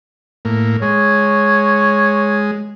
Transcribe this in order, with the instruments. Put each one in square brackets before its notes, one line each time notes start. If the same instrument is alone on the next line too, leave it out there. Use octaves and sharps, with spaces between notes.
[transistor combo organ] A2 A#3
[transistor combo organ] G#3 [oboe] C#5